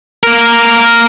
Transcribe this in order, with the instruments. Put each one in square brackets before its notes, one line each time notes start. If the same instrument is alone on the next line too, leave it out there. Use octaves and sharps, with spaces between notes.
[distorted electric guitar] A#3 A#4